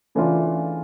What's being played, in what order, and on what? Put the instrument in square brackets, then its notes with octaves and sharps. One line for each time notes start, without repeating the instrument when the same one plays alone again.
[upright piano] C#3 E3 A3 D4 F4